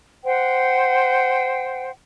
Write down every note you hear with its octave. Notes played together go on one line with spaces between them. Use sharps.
C5 F#5 G5